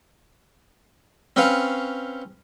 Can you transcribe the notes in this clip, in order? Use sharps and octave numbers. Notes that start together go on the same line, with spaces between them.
C4 C#4 B4 C#5 F5